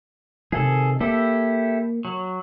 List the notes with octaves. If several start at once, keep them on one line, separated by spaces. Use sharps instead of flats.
C3 D#3 G#4 A4
A#3 E4 G4 A4
F#3